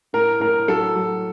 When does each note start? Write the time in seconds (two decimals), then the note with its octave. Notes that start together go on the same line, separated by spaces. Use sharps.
0.13 A2 A#4
0.40 A2 A#4
0.68 F#3 A4
0.96 F#3